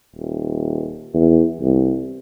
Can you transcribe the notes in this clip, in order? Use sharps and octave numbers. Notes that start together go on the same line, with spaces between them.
D#1
E2
C2